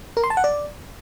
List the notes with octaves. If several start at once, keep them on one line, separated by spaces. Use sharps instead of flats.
A#4
C6
A5
F#5
D5